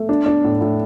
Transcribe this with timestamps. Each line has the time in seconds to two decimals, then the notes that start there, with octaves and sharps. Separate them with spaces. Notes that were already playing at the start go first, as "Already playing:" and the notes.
Already playing: A3
0.09 D4
0.26 D4
0.44 A2
0.61 A2